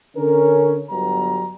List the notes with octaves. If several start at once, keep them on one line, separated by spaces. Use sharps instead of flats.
D3 C#4 A#4
G1 F#3 G3 B3 A#5